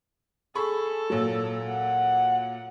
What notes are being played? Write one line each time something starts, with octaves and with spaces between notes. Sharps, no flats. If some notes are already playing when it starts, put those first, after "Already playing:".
G#4 A4 B5 C#6
A#2 F#3
F#5